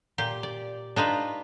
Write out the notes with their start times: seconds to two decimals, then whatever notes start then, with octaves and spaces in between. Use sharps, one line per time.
0.18 A#2 G4
0.43 D5
0.96 D4 D#4 F4 B4